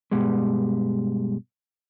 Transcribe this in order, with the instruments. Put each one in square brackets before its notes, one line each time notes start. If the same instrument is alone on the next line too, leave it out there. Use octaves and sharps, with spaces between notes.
[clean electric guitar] G2 B2 G3 G#3